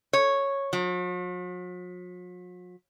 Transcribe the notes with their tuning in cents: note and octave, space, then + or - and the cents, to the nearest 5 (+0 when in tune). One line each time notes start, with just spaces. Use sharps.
C#5 -5
F#3 -45